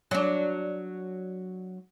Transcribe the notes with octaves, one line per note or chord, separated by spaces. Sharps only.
F#3 D4